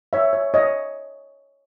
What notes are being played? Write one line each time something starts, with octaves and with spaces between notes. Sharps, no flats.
C#5 E5
C#5
C#5 D#5